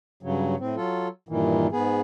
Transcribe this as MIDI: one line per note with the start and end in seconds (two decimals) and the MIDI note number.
0.23 0.55 43
0.23 0.55 49
0.23 0.55 54
0.60 0.75 45
0.60 0.75 60
0.76 1.08 54
0.76 1.08 65
0.76 1.08 69
1.29 1.67 43
1.29 1.67 46
1.29 1.67 51
1.29 1.67 52
1.72 2.01 44
1.72 2.01 59
1.72 2.01 68